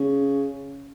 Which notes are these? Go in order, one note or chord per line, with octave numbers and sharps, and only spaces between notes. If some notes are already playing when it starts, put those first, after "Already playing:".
Already playing: C#3